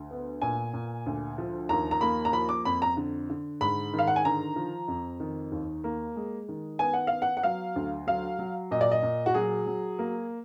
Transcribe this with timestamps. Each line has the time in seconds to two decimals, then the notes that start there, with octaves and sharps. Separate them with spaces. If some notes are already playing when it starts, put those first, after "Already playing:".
Already playing: D2
0.11 B3
0.42 A#2 G#5
0.73 A#2
1.06 D2
1.38 F3
1.69 D#2 A#5
1.91 A#5
2.01 A#3 B5
2.25 A#5
2.33 F3 B5
2.49 D6
2.65 F2 B5
2.82 A#5
2.97 D3
3.30 D3
3.61 G#2 B5
3.93 D#3
3.99 F5
4.08 F#5
4.16 G#5
4.25 D3 A#5
4.56 F3
4.88 F2
5.20 D#3
5.52 D#2
5.84 A#3
6.16 G#3
6.49 D#3
6.79 B3 G#5
6.93 F#5
7.07 B3 F5
7.22 F#5
7.37 F#5
7.43 F#3 F5
7.76 D2
8.07 F#3 F5
8.39 F#3
8.71 A#2 D#5
8.81 D5
8.92 D#5
9.03 A#2
9.26 F#4
9.34 F#3 G#4
9.66 F#3
9.99 A#3